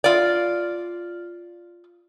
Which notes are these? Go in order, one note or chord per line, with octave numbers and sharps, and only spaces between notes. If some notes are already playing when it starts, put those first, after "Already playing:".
F4 D5